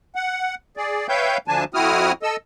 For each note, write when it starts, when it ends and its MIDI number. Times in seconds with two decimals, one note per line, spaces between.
0.15 0.55 78
0.77 1.07 68
0.77 1.07 74
1.09 1.38 71
1.09 1.38 73
1.09 1.38 76
1.09 1.38 77
1.09 1.38 79
1.09 1.38 91
1.48 1.64 38
1.48 1.64 50
1.48 1.64 53
1.48 1.64 62
1.48 1.64 80
1.48 1.64 81
1.74 2.12 41
1.74 2.12 60
1.74 2.12 64
1.74 2.12 66
1.74 2.12 87
1.74 2.12 89
2.23 2.36 69
2.23 2.36 75
2.23 2.36 88